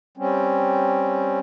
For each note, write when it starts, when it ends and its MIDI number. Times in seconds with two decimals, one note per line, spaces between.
0.17 1.39 55
0.17 1.39 60
0.17 1.39 61